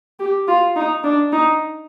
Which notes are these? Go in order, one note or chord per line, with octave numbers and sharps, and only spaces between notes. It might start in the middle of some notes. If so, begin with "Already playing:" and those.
G4
F4
D#4
D4
D#4